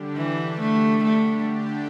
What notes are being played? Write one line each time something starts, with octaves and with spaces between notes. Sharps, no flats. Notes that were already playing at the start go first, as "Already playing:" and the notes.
Already playing: D3 G3 D4 G4
E3
A3
A3
D3 A3 D4 G4